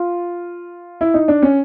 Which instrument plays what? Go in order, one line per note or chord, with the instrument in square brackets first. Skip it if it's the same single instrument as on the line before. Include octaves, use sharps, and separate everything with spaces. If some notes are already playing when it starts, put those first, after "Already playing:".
Already playing: [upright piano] F4
E4
D#4
D4
C#4